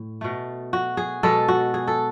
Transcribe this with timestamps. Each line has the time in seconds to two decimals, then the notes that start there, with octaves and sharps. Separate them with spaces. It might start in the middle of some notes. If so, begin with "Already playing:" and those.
Already playing: A2
0.21 B2 A3
0.73 F#4
0.97 G#4
1.23 B2 G#3 A4
1.48 F#4
1.74 G#4
1.88 A4